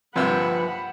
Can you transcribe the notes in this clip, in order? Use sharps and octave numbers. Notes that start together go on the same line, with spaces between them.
G2 C3 F3 A#3 B4 F#5 B5